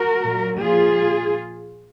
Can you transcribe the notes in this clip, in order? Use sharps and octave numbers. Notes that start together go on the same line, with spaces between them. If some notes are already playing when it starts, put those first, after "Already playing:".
Already playing: F#4 A#4
A#2 F#3
A#2 F3 F4 G#4